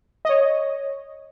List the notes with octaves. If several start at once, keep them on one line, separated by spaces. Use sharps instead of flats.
C#5 D#5